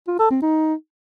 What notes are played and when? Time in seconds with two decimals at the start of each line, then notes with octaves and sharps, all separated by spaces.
0.08 F4
0.19 A4
0.31 C4
0.42 D#4